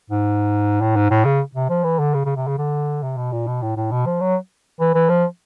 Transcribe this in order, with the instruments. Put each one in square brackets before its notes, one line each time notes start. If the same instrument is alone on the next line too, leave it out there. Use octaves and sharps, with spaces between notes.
[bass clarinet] G#2
A2
G#2
A2
C#3
C3
F3
E3
D3
C#3
C#3
C3
C#3
D3
C3
B2
A#2
B2
A2
A2
B2
F3
F#3
E3
E3
F3